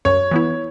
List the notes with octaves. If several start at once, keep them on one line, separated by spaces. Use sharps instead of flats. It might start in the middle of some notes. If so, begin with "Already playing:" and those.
F#2 C#5
E3 B3 E4